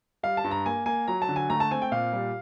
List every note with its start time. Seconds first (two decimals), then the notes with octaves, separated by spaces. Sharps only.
0.23 G3 F5
0.37 A5
0.44 G2
0.51 A#5
0.66 A#3 G#5
0.86 A#3 G#5
1.08 F#3 A#5
1.22 A5
1.29 D3
1.36 G#5
1.50 A3 A#5
1.60 A5
1.71 C4 G#5
1.82 G5
1.92 A#2 F5
2.13 G3